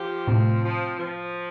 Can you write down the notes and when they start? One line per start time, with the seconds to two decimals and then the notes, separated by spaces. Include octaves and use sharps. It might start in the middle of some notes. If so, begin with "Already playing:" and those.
Already playing: F3 G4
0.27 A2 C3 C4
0.64 F3
0.99 F3